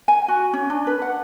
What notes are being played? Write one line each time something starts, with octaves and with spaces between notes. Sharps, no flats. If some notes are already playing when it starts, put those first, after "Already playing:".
G#5
F#4
C#4
D4
B4
F#5